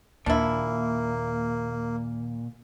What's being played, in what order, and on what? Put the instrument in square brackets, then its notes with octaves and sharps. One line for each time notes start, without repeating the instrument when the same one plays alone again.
[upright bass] D#2 [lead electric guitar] A#2 [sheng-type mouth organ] A#3 [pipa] D4 E4